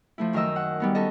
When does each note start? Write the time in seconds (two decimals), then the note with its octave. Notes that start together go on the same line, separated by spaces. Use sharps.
0.18 F3 A3 E4
0.33 F#2 D#3 A#4 D#5 E6
0.56 F#5
0.80 G3 B3 D#4
0.95 C#4 A4 D#5